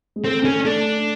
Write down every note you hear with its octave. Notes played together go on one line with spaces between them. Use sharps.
G#3
A3 C4
A3 C#4
A3 D4